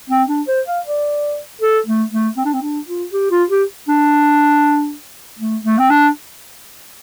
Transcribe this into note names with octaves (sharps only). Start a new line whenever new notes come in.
C4
D4
C5
F5
D5
A4
A3
A3
C4
D4
C4
D4
F4
G4
F4
G4
D4
A3
A3
C4
D4